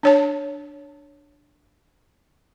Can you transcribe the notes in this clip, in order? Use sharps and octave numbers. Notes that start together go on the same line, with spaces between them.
D4 C#5 A5